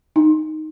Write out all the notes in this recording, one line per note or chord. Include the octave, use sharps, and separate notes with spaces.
D#4